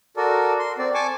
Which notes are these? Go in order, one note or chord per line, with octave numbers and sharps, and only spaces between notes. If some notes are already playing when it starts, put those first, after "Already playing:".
F#4 A4 A#4 D5
C6
C4 D5
G#5 A5 C#6 D6